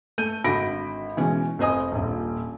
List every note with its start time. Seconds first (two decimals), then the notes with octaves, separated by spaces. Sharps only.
0.18 A3 G6 D#7
0.44 G#1 D3 F#4 B5 A#6 D7
1.17 B2 E3 G#3 C#4
1.59 F1 C5 D#5 G#5 D#6
1.92 D#1 A#1